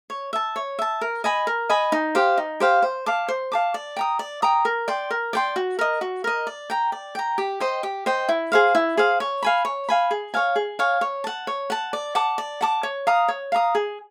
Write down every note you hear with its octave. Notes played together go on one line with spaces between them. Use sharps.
C#5
E5 A5
C#5
E5 A5
A#4
D#5 G#5 B5
A#4
D#5 G#5 B5
D#4
G4 C5 F5
D#4
G4 C5 F5
C5
F5 A5 D6
C5
F5 A5 D6
D5
G5 A#5 D#6
D5
G5 A#5 D#6
A#4
D5 G5 C6
A#4
D5 G5 C6
F#4
A#4 D#5
F#4
A#4 D#5
D5
G5 A#5
D5
G5 A#5
G4
C5 D#5 G5
G4
C5 D#5 G5
E4
G#4 C5 F5
E4
G#4 C5 F5
C#5
F5 G#5 B5
C#5
F5 G#5 B5
G#4
C#5 F5 G#5
G#4
C#5 F5 G#5
C#5
F#5 A5
C#5
F#5 A5
D5
F#5 A5 D6
D5
F#5 A5 D6
C#5
F5 A#5 D#6
C#5
F5 A#5 D#6
G#4